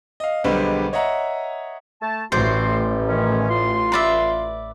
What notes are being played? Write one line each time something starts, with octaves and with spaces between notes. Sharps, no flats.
D#5 F5
B1 D3 G3 G#3 B4 C5
C#5 D#5 E5 F#5 A#5
A3 A5
A1 A3 F#4 C5 D5 C6
D#3 C#4
F4 C6
B4 D5 E5